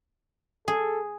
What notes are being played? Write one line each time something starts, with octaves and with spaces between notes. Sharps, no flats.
G#4 A4